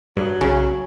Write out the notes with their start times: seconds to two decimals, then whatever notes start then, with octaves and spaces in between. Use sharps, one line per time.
0.17 G2 F#3
0.41 B1 C#3 C#4